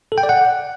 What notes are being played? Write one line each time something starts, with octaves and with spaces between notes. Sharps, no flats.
A4
G5
D5
F#5